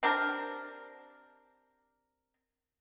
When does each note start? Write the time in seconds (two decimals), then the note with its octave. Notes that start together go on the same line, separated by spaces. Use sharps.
0.03 C4 D4 G4 A#4